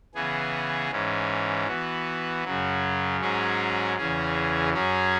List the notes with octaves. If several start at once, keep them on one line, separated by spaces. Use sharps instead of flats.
C#3 E3 B3 G#4
G#2 E3 C#4
E3 B3 F#4
F#2 C#3 F#3
G#2 F#3 C#4 G#4
E2 C#3 E3 C#4 G#4
F#2 F#3 C#4 G#4